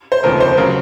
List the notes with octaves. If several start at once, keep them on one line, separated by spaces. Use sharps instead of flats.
C5
F1 D#2 C#3 F3 A#4
C5
C#3 F#3 A#4